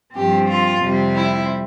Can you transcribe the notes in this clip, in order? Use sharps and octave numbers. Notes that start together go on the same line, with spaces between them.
G2 F3 C4 G4
F4
F2 C3 G3 C4
E4